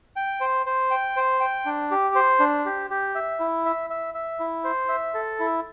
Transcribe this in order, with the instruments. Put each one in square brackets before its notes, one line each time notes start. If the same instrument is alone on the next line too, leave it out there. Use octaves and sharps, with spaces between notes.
[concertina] G5
C5
C5
G5
C5
G5
D4
G4
C5
D4
G4
G4
E5
E4
E5
E5
E5
E4
C5
E5
A4
E4